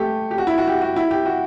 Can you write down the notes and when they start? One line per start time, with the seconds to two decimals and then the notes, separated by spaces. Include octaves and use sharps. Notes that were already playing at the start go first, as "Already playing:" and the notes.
Already playing: A3 G4
0.31 G4
0.38 F#4
0.47 E4
0.58 F#4
0.67 G4
0.82 F#4
0.96 E4
1.11 G4
1.26 F#4